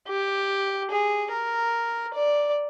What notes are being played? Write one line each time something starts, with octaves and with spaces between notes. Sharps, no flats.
G4
G#4
A#4
D5